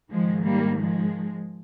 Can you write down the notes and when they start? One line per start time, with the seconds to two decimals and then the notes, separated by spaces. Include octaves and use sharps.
0.11 G#2 D#3 F3 G#3
0.46 G3 A#3
0.81 F3 G#3